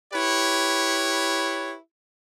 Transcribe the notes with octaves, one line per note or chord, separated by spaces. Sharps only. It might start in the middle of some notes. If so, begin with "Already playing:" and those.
E4 G4 B4 C#5